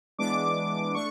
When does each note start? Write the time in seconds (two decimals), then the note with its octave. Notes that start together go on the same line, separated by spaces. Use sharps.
0.18 E3 G#3 B3 D4 D6
0.94 A3 D4 C#6